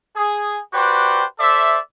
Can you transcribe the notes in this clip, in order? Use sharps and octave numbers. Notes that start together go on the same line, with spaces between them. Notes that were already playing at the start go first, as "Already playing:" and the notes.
G#4
F#4 G4 B4 C5 D5 G5
A4 C5 D5 E5